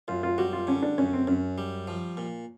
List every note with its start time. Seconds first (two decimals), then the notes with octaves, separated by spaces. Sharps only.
0.08 F#2 F4
0.23 F4
0.38 G3 F#4
0.53 F4
0.67 D3 C#4
0.82 D4
0.98 F#2 C#4
1.13 C4
1.27 F#2 C#4
1.58 G3
1.87 F3
2.17 A#2